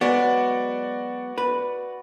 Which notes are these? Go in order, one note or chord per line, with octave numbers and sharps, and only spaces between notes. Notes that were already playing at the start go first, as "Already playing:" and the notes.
F#3 G#3 B3 F#4 D5 F#5
B4